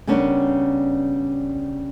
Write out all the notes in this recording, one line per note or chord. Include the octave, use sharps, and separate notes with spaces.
C#3 G3 B3 C#4 D4 A#4